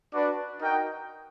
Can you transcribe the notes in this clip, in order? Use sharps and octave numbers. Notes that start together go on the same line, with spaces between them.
D4 F#4 B4 D5
D#4 F#4 A#4 D#5 G5